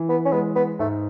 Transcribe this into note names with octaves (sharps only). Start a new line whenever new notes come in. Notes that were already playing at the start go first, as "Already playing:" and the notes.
Already playing: E3
B3
C#4
G#3 B3
B3
G#2 A3